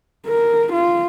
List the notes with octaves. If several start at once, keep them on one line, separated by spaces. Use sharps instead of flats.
A#4
F4